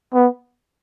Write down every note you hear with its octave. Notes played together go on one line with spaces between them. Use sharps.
B3